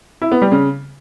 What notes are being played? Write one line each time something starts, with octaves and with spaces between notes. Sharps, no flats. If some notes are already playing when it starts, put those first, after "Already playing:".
E4
B3
G3
C#3